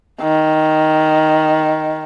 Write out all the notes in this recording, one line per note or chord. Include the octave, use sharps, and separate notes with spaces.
D#3